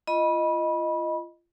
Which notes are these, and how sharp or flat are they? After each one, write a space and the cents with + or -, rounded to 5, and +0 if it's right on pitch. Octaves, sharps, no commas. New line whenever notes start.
F4 -30 D#5 +0 B5 -25